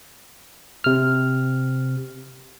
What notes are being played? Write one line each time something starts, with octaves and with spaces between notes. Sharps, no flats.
C3 F6